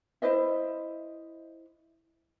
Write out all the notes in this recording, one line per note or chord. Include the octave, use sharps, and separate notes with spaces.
E4 C5 D#5 E5